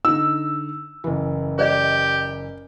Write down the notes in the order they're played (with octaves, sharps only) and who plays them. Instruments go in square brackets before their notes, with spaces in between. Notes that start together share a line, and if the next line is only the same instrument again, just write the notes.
[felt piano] D3 D#4 [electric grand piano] E6
[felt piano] F#1 E3
[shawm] G4 [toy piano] C5 D5 D#5